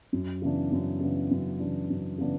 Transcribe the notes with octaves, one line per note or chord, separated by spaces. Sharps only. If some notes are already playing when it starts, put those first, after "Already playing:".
F#2
C#3 E3 B3 D4
F#2
C#3 E3 B3 D4
F#2
C#3 E3 B3 D4
F#2
C#3 E3 B3 D4